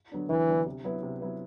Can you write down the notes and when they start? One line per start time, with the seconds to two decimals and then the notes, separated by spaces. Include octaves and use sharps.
0.12 D3 F#3 B3 D4
0.29 D2 E3
0.48 D3 F#3 B3 D4
0.66 C3
0.84 F#3 B3 E4 B4
1.03 C3
1.21 F#3 B3 E4 B4